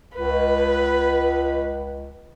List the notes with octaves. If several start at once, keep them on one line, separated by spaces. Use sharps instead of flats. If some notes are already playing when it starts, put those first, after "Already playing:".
C#2 B4